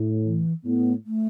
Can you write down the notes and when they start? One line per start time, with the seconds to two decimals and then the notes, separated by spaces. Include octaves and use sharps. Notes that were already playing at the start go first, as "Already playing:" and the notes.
Already playing: A2
0.24 E3
0.64 A2 B3
1.06 A3